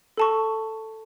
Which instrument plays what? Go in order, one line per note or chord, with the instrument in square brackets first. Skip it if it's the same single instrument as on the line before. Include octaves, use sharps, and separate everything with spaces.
[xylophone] A4 A5 C#6